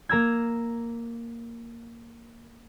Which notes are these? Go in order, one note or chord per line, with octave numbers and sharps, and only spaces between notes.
A#3 A#5 E6 G#6